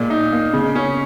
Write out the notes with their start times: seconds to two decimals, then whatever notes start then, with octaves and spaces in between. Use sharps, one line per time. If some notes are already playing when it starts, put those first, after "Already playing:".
Already playing: A#2 G#3
0.10 D#4
0.32 A#3
0.53 C#3
0.75 C#4